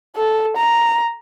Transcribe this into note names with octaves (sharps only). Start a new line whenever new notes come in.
A4
A#5